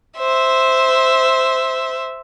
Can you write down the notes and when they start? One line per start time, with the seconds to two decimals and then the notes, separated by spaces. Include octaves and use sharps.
0.19 C5 E5